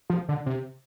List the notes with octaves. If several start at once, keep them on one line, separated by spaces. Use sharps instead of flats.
F3
D3
C3